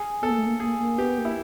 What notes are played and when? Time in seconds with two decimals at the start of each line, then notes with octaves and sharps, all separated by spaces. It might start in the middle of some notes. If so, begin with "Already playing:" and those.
Already playing: G#4
0.22 B3 A4
0.30 A#3
0.38 A3
0.46 A#3
0.60 A#3 G#4
0.79 A#3
0.98 B3 G4
1.18 A#3
1.25 E4